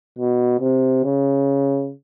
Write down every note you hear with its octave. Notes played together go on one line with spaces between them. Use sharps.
B2
C3
C#3